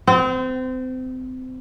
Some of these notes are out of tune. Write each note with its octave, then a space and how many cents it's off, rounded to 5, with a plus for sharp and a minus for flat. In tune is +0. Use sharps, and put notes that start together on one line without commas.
C4 -30